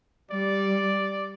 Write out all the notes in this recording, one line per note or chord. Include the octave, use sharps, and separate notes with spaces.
G3 D5